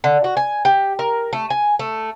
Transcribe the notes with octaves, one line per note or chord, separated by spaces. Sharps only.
D3
F#4
G#5
G4
A#4
A3
G#5
A3